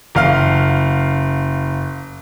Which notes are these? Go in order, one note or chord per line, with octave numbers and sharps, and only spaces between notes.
F#1 F5 F6